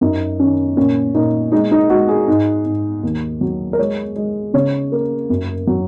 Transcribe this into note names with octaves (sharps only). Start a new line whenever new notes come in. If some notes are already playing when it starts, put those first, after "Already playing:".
F#2 D#4
D#3 C#4
A#2 C#4
A#2 D#4
G#3 D#4
D#4
G#3 F#4
G#4
G#2
G#2
D#2
F#3
A#4
G#3 C#5
G#3
C#3 C#5
A#3
F#2
F#3